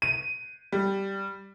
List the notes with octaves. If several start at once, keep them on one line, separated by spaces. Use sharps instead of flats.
D#7
G3